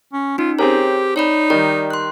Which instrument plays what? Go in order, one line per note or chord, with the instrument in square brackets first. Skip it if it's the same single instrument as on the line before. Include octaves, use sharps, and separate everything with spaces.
[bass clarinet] C#4
[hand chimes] C#4 D#4 [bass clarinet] F4
[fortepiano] C4 G#4 A#4 [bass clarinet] G4 [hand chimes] C#5
[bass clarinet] D#4 [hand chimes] C#5 D5 B5
[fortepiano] D#3 G3 [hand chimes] D5
[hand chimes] C6 F#6